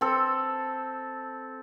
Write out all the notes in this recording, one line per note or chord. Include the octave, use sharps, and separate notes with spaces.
C4 A4